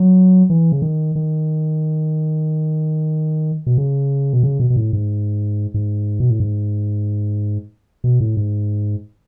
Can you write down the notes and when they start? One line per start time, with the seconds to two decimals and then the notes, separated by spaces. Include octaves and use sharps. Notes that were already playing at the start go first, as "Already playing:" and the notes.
Already playing: F#3
0.50 E3
0.72 C#3
0.82 D#3
1.15 D#3
3.66 B2
3.78 C#3
4.33 B2
4.43 C#3
4.60 B2
4.70 B2
4.76 A2
4.93 G#2
5.74 G#2
6.20 B2
6.30 A2
6.40 G#2
8.04 B2
8.20 A2
8.37 G#2